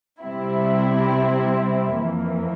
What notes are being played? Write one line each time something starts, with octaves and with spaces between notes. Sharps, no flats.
C3 G3 C4 E4
F2 E3 A#3